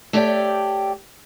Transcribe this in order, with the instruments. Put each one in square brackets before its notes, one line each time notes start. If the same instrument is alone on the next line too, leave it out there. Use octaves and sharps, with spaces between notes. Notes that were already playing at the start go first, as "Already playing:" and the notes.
[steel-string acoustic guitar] A3 G4 C#5 D5 F5 G5